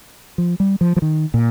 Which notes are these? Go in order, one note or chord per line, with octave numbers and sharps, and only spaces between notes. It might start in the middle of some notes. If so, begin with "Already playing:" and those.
F3
G3
F3
F3
D#3
A#2